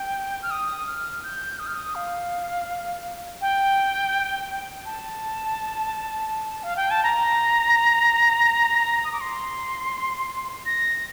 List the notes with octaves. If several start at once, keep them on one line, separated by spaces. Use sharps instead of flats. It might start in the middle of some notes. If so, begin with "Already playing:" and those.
Already playing: G5
F6
D#6
F6
G6
D#6
F6
D#6
F5
G5
A5
F5
G5
A5
A#5
D#6
D6
C6
A#6